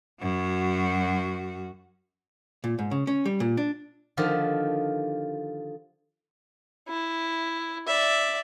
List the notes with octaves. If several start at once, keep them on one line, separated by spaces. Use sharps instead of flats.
F#2 F#4
A#2
G#2
C#3
C#4
G3
A#2
D4
D3 D#3 F3 G4
E4
D5 E5